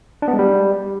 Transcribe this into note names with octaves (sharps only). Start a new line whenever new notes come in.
D4
B3
G#3
G3